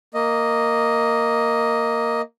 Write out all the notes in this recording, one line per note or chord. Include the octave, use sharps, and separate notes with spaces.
A#3 D#5